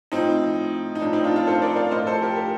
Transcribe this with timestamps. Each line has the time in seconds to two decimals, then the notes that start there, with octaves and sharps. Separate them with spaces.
0.12 A2 F3 C4 D#4
0.95 D#4
1.02 A2 F3 D4
1.13 C4 D#4
1.24 D4 F4
1.36 D4 F4
1.47 A4 C5
1.62 A#4 D5
1.76 D5 F5
1.91 A2 C5 D#5
1.96 F3
2.07 A4 C5
2.22 G4 A#4
2.36 G4 A#4